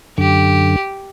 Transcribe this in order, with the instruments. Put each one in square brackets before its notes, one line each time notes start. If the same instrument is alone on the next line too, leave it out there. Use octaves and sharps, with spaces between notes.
[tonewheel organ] F#2 D3 [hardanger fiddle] G4